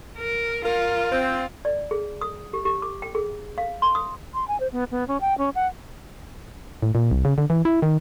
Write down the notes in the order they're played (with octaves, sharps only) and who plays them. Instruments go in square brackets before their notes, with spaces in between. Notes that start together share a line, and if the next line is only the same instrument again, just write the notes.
[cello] A#4
[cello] F4 [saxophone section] A#4
[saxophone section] C4
[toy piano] D5
G#4
D#6
G4
G4
D6
G5
G#4
F5
C6
D#6
[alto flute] C6
G#5
C5
B3
B3
C#4
G5
C#4
F#5
[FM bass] A2
A#2
C2
C#3
D3
E3
E4
D#3